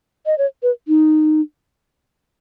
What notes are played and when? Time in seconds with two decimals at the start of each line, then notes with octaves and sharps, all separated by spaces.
0.26 D#5
0.38 C#5
0.63 B4
0.88 D#4